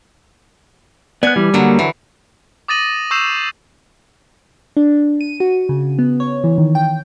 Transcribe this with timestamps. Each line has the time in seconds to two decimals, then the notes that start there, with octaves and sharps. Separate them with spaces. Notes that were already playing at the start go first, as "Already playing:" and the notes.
1.23 B3 D5 G#5 F#6
1.36 E3 G3
1.54 D3 F#3 A#3
1.79 E3
2.68 D6 D#6 A6 A#6 D#7 F#7
3.11 C#6 E6 G6 C7 E7 F7
4.77 D4
5.21 D#7
5.40 F#4
5.69 C#3
5.99 B3
6.20 C#5
6.44 E3
6.58 D#3
6.75 G5